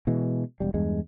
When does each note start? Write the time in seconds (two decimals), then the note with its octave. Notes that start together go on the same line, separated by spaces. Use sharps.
0.07 B2 E3 G#3
0.60 E1 G3
0.74 E2 G2 G#3